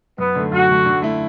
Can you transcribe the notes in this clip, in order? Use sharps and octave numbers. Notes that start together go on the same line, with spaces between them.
F#2 B3
D3 A3
F#2 F#4
D3 A3
D3
A3 E4